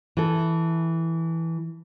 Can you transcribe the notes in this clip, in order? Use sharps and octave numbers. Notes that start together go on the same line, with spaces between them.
E3 A4